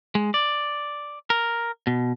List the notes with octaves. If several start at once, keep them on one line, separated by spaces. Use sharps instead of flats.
G#3
D5
A#4
B2